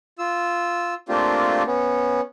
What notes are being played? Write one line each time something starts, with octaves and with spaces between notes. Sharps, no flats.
F4 E6
A3 A#3 C4 D4 F4 G4
B3 C#4